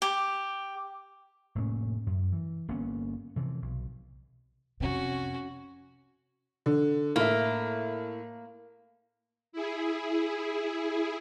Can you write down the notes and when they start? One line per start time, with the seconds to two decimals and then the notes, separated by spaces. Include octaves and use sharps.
0.02 G4
1.55 F1 A2 A#3 C#4
2.07 F#2
2.32 E3
2.68 G1 A#3 B3 C#4
3.36 C3 E3 F3
3.62 B1
4.80 F2 C3 C#4 F#4
6.66 D3
7.16 A2 A#3 E5
9.52 E4 G#4